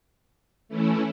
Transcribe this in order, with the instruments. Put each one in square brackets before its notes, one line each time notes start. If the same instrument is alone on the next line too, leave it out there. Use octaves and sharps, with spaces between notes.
[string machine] E3 A3 C#4 E4